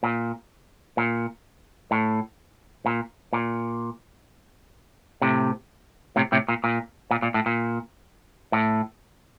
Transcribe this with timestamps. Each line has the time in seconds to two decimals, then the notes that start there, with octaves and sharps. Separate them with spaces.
0.03 A#2
0.97 A#2
1.91 A2
2.86 A#2
3.33 A#2
5.22 A2 C3
6.16 A2 C3
6.32 A2 C3
6.48 A#2
6.64 A#2
7.11 A#2
7.22 A#2
7.34 A2
7.46 A#2
8.52 A2